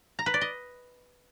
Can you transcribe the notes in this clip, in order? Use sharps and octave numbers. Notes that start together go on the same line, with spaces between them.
A#5
B4
D5
D#5